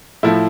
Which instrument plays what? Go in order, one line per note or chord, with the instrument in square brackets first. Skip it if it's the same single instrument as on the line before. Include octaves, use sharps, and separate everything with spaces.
[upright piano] A2 F3 A3 [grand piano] E4